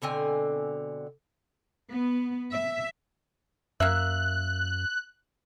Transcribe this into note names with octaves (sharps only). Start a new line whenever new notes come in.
B2 D3 C4 G#5
B3
E5
F#2 A#3 E5 F#6